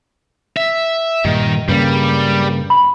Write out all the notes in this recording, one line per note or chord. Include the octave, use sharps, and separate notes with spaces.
E5
G2 A#2 D#3
G2 C#3 G3 A#3
B5